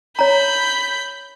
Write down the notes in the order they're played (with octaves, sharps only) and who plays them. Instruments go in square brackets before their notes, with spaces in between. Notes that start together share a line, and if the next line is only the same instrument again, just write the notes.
[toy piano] C#5 A#5 [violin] B5 G6